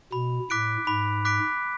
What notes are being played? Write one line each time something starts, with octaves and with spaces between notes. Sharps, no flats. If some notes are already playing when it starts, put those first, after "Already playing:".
B2 B5
A2 D6 F#6 B6 D7
G#2 B5
D6 F#6 B6 D7